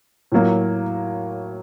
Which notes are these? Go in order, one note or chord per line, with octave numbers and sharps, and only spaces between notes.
A2 F#3 A#3